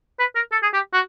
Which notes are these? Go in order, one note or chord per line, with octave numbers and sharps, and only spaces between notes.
B4
A#4
A4
G#4
G4
F#4